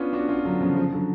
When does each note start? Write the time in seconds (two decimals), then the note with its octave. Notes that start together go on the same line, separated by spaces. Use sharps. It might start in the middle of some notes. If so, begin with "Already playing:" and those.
Already playing: B3 C#4 D4 F4
0.13 D4 F#4
0.29 C#4 F4
0.45 D3 F#3
0.60 C#3 F3
0.76 C#3 F3
0.92 D3 F#3